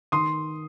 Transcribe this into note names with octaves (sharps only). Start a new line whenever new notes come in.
D#3 C6 D#6